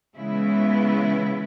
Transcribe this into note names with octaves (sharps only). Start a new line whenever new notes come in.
C#3 E3 G#3 B3 E4